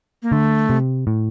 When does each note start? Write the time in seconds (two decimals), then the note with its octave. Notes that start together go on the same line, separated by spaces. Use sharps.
0.23 A#3
0.32 D3 A3
0.70 C3
1.07 A2